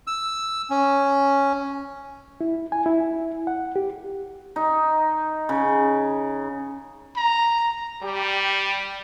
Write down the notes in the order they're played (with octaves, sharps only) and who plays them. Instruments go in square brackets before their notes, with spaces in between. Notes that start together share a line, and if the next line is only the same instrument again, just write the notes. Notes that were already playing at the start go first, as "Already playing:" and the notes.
[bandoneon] E6
C#4
[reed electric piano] E4
G#5
E4
F#5
G4
[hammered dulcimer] D#4
C#3
[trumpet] A#5
[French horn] G3 [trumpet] G4